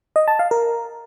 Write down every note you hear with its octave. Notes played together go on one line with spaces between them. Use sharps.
D#5
A5
F5
A#4